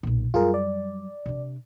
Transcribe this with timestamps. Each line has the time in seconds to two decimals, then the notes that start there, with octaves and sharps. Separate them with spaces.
0.03 B1 A#2
0.34 F#2 G3 F4 G#4 A#4
0.54 D5
1.26 C3 D4